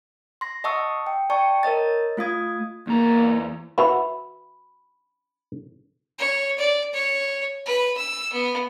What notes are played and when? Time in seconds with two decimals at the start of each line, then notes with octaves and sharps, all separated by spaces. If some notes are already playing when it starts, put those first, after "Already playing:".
0.41 C6 A#6
0.64 D#5 F#5 A5 C#6 D#6 E6
1.07 G5
1.30 D5 G5 A5 C#6
1.63 A#4 C#5 D#5 A6
2.17 A3 F4 F5 D#6 G#6
2.87 E2 A#3 A#5
3.78 F#4 B4 E5 B5
6.19 C#5
6.58 D5
6.94 C#5
7.66 B4
7.97 E6
8.33 B3